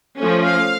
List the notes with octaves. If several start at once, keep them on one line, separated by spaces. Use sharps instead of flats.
F3 A3 C#4
F5